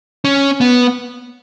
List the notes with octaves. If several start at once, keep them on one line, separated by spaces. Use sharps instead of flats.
C#4
B3